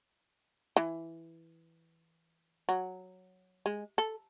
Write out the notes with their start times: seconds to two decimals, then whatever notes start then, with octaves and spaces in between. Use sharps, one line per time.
0.76 E3
2.69 F#3
3.66 G#3
3.98 A4